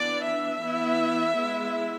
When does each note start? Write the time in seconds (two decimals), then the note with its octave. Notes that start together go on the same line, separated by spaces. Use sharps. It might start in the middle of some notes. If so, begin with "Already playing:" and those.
Already playing: E3 B3 D4 D5
0.25 E5
0.62 E3 B3 E4
1.35 G#3 B3 E4